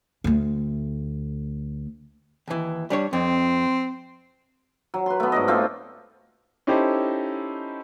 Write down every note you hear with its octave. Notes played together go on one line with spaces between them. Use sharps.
D2 A3
D#2 E3
G3 D4 C#5
F2 C4
F#3
B4 C6
A3 B3
G#2 D5 D#5
A3 C4 F4
C#4 D#4 E4 G4 A4 C5